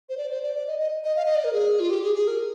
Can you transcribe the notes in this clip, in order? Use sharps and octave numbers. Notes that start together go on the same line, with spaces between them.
C5
D5
C5
D5
D5
D#5
D#5
D#5
F5
D#5
D5
A#4
G#4
F4
G4
G#4
G#4
A#4